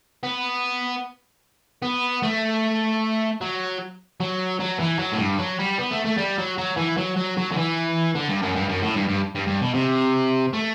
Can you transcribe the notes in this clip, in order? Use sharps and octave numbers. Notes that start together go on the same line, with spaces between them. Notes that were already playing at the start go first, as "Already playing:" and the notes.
B3
B3
A3
F#3
F#3
F#3
E3
F#3
A2
G2
F#3
G3
B3
A3
A3
G3
F#3
F#3
E3
F#3
F#3
F#3
D3
E3
D3
G2
F#2
G2
F#2
A2
G2
G2
G2
G2
B2
C3
A3